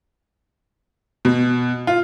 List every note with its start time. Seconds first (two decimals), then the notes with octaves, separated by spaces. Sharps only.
1.25 B2
1.87 F4